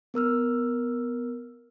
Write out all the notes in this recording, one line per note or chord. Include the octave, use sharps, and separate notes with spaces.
B3 A#4 E6 F6